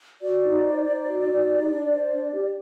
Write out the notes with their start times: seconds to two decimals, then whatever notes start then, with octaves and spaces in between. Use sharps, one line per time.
0.22 F#4 D5
0.43 D#4
0.65 C5
0.86 D#4
1.07 F#4
1.28 D#4
1.49 G4
1.71 D4
1.91 C5
2.12 D4
2.33 G4